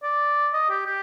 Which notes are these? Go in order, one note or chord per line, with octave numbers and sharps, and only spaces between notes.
D5
D#5
G4
G4